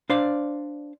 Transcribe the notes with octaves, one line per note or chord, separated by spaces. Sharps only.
D4 C5 D5 F5